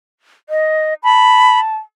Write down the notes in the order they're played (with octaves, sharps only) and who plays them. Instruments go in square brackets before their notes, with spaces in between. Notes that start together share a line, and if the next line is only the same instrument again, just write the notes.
[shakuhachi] D#5
[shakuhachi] A5 [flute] B5